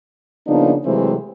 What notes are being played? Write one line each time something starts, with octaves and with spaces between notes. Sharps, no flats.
C#3 F3 A#3 B3 D4 D#4
C3 E3 F#3 G#3 A3 C4